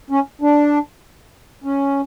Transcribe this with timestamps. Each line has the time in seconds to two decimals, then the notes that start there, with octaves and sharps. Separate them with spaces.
0.10 C#4
0.41 D4
1.64 C#4